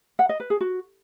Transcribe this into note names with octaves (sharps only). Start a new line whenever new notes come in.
F#5
D#5
B4
G#4
F#4